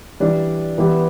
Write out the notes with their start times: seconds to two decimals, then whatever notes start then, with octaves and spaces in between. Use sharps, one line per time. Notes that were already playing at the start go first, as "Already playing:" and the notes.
0.20 E3 G3 D4
0.78 E3 G3 B3 E4 G4